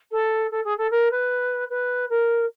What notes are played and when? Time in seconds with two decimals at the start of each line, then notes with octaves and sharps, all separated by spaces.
0.11 A4
0.51 A4
0.64 G#4
0.77 A4
0.90 A#4
1.11 B4
1.69 B4
2.09 A#4